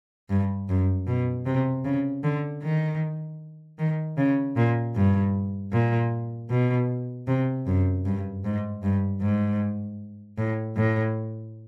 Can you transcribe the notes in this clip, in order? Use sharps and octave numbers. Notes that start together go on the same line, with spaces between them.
G2
F#2
B2
C3
C#3
D3
D#3
D#3
C#3
A#2
G2
A#2
B2
C3
F#2
G2
G#2
G2
G#2
A2
A2